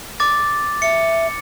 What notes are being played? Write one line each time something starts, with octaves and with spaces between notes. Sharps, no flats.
D6 A6
E5 C#7